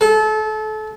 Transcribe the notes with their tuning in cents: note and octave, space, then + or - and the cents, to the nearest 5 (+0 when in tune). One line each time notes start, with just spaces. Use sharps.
A4 -30